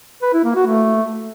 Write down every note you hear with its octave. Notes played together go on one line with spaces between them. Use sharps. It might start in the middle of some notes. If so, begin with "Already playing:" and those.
B4
E4
A#3
F#4
A3